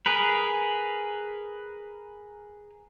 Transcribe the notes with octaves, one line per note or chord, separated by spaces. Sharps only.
G#4 A#4 B4